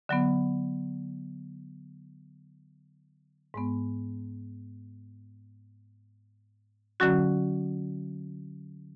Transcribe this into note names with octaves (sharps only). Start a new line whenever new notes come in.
D3 F#3 B3
G#2 G#3 B3
D3 F#3 C#4 F#4